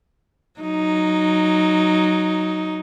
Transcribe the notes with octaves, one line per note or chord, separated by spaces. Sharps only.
F#3 D#4